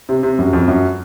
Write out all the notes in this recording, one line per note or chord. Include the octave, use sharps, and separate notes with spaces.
C3
C3
F#2
F2
F#2